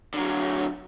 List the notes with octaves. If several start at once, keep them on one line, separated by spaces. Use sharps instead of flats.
D3 F#3